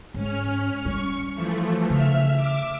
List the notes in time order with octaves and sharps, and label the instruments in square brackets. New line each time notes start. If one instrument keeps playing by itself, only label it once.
[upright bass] G#2 [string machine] C#4 F6
[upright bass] G3 [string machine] C#6
[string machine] E3 F3 A3
[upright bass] C#3 [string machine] E5 F6
[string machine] E5 D6